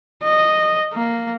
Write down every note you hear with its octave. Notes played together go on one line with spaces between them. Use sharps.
D#5
A#3